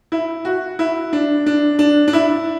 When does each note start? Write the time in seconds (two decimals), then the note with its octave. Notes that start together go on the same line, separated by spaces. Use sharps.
0.12 E4
0.45 F#4
0.79 E4
1.13 D4
1.46 D4
1.79 D4
2.08 D4
2.13 E4